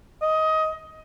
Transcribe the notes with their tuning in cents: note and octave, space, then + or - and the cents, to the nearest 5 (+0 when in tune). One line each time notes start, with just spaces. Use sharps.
D#5 +20